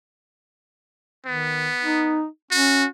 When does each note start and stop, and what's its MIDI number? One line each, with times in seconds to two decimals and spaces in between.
1.26 1.69 51
1.26 2.22 59
1.84 2.26 63
2.51 2.86 61
2.51 2.87 66